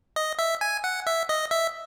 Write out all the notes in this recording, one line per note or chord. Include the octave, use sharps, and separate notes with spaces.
D#5
E5
G#5
F#5
E5
D#5
E5